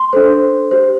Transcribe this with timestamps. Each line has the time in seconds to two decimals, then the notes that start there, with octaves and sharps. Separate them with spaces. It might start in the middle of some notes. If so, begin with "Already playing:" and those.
Already playing: C6
0.13 D4 A4 C5
0.71 G4 C5